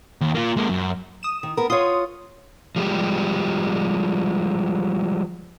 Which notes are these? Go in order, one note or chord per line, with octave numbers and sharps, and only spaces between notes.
D#2
A#3 F4
G#3 A#3
F#2
D#6 E7
D#3
B3 A#4
F4 C#5 C6 D#6
F3 G3 G#3 G4